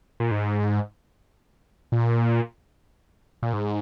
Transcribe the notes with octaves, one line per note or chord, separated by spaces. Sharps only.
A#2
G#2
A#2
A#2
G#2